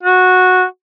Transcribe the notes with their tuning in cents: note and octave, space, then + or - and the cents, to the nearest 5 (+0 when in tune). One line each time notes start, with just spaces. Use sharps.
F#4 -10